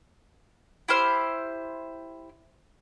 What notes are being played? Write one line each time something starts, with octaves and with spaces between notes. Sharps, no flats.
E4 G4 C5 F6